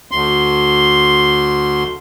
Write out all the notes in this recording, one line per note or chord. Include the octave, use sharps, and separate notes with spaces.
D2 C6